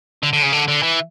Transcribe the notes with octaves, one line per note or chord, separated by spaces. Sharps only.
D3
D3
C#3
D3
D3
E3